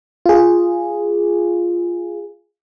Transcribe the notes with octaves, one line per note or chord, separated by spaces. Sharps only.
F4 G#4